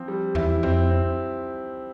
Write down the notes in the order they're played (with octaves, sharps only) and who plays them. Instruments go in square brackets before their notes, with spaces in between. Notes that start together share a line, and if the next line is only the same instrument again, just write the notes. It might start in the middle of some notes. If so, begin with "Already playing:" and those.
Already playing: [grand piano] F3 C4
G3
[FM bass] E2 [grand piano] E4
[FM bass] F2 [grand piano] C4
[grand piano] C4